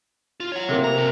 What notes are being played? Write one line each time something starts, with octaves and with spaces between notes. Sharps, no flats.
F4
C#5 F#5
C3 A#3
A#5
F#4 A#4